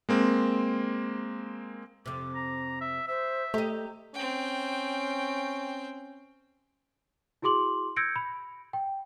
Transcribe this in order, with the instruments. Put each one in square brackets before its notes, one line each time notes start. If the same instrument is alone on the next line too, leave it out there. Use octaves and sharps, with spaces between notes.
[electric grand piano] G#3 A#3 C4
[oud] F2 C3 [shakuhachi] D6
[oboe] A#5
E5
[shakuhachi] C5 [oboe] E5
[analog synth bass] A3 [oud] G4 D#5 [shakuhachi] A#5
[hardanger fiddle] C4 G5 [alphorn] C#4
[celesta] E4 F#4 G#4 C6 D6 F#7
E6 G6 G#6 A#6 C#7 D7
B5
G5